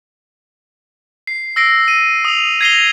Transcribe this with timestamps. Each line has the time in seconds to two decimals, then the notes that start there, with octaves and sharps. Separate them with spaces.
1.27 C7
1.56 E6 A#6 C7 D7
1.88 D#7
2.25 D#6 F7
2.61 G#6 A#6 C7 D#7 F7 G7